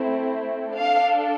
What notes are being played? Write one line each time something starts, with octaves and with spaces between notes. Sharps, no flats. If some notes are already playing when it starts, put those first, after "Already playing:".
Already playing: A3 C4 E4
D4 A4 F5